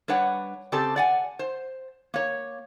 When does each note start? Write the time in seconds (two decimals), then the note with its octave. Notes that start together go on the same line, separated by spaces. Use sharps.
0.08 G3 D4 B4 C#5 F#5
0.72 C#3 C4 G4 A4 D5 A5
0.96 D5 F#5 G#5
1.39 C5
2.14 A#3 C#5